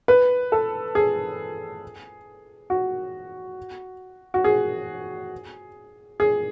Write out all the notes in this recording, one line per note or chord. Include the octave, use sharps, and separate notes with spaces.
B4
A4
G#4
F#4
F#4
G#4
G#4